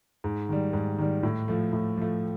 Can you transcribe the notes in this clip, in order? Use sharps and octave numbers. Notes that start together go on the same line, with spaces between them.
G#2
D#3 G3
G#2
D#3 G3
A2
F3 A3
A2
F3 A3